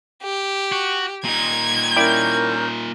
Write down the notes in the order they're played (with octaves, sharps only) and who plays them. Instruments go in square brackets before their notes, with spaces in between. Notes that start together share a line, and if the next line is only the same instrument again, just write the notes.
[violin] G4
[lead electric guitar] F#4
[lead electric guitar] A#2 D#4 [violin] G#6
[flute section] C#4 A#4 G6 [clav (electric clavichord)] E4 D5 G5